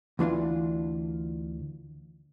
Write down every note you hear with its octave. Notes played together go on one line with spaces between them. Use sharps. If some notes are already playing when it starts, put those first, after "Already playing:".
D2 E3 D4 F4